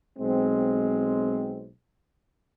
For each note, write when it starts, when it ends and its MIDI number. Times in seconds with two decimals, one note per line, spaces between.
0.18 1.68 35
0.18 1.68 56
0.18 1.68 60